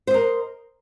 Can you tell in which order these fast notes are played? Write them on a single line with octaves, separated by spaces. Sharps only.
C5 D#5 A#4